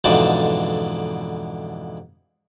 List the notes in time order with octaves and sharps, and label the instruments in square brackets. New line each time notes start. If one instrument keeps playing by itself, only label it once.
[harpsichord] F2 G#2 B2 D3 E3 A5